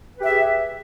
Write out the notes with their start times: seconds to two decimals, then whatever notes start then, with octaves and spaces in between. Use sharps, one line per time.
0.17 B4
0.20 G4
0.24 E5
0.27 G#4